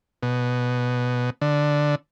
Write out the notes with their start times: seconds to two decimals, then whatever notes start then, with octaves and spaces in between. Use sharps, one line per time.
0.23 B2
1.42 D3